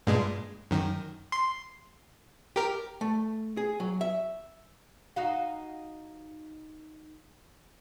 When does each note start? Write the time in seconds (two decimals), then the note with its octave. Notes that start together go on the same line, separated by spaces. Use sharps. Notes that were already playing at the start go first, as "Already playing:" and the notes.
0.07 G2 A#2 G#3
0.71 F#2 D#3
1.32 C6
2.56 G4 A#4
3.01 A3
3.57 G#4
3.80 F#3
4.01 E5
5.16 D#4 F#4 F5